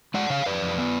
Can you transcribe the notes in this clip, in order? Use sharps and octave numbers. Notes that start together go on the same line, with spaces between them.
G#3 D5 F#5
C#3 C#5 F5
F2 B4 D5
F2
B3